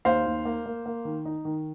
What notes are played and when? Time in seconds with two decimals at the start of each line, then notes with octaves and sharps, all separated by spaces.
0.05 D#2 C5 F5
0.26 D#2
0.45 A#3
0.66 A#3
0.86 A#3
1.05 D#3
1.25 D#4
1.45 D#3